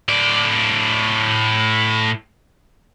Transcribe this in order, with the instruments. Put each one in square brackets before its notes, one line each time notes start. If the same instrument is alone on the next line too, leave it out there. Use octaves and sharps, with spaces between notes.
[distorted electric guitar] A2 D5